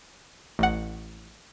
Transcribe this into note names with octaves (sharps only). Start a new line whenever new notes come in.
A1 F#5